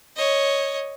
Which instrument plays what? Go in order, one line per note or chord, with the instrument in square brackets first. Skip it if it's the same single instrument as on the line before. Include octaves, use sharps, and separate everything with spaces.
[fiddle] C#5 D#5